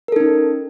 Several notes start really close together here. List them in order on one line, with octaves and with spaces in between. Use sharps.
A#4 A4 D#4 C#4